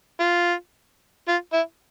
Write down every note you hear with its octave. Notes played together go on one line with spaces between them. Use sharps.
F4
F4
E4